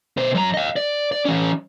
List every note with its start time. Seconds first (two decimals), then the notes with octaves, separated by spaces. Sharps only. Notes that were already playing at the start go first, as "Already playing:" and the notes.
0.17 B2 C5
0.35 F#2 A#5
0.54 D#5 F5
0.76 D5
1.12 D5
1.25 E3 C#4